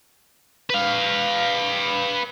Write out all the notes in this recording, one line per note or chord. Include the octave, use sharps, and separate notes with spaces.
B4 F5